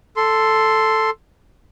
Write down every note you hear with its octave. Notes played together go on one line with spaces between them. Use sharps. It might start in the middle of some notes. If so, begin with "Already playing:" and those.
A4 C6